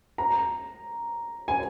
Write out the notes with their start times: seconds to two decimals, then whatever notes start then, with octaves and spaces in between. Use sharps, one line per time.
0.18 A#5
1.48 G#5